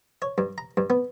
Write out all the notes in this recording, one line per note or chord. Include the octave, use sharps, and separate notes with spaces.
C#5
G2
A#5
G2
B3